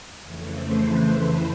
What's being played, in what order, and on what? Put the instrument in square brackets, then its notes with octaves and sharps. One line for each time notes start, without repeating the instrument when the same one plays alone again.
[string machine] F2 C#3 E3 A3 C#5
C5
B4